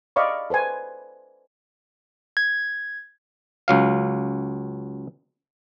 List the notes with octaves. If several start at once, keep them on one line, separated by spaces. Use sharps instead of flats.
D5 D#5 F5 B5 C#6
A4 B4 C5 G#5
G#6
C#2 F#3 F5